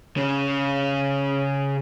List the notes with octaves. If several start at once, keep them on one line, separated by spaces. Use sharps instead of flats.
C#3 C#4